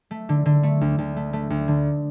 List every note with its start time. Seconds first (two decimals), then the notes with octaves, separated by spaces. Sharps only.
0.11 A3
0.29 D3
0.46 D3
0.63 A3
0.81 D2
0.98 D2
1.16 A3
1.33 A3
1.50 D2
1.68 D3